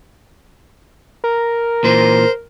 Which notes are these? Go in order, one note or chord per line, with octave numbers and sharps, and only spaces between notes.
A#4
A#2 E3 C5